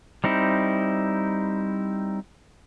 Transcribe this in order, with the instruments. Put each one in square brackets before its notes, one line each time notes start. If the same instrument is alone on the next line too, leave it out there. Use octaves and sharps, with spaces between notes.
[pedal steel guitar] G3 C4 D#4 E4